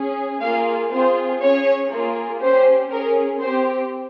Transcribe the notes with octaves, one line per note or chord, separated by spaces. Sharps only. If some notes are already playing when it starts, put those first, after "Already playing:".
Already playing: C#4 G#4
A#3 F4 G#4 F5
C4 F4 G#4 C5
C#4 G#4 C#5
A#3 F4 G#4
C#4 G4 C5
C#4 G#4 A#4
C4 G4 C5